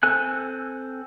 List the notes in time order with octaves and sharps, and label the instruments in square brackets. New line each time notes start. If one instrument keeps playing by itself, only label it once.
[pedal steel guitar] C4 A4 G#5 F#6